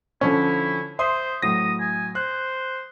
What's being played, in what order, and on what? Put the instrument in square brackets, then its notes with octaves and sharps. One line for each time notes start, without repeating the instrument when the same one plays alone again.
[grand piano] D3 F3 C#4 [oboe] E4
[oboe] C5 [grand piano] E5 C6 D#6
[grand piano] A2 F#3 A#6 [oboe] D#6
[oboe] G#5
[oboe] C5 [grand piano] F#6